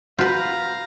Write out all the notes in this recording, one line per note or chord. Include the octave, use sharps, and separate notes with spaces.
F4 F#4 B4 F5 A#5 F6 G6